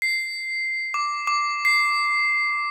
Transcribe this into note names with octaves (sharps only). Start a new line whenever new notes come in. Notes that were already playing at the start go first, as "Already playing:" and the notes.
C7
D6
D6
C7